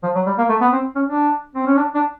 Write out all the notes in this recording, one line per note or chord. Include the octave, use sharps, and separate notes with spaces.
F3
F#3
G3
A#3
A3
B3
C4
C#4
D4
C4
C#4
D4
D4